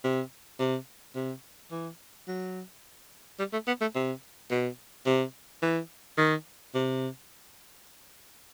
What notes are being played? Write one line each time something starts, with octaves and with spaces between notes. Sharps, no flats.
C3
C3
C3
E3
F#3
G3
A3
B3
A3
C3
B2
C3
E3
D#3
C3